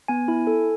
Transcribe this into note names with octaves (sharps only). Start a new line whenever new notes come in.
B3 G#5
E4
A4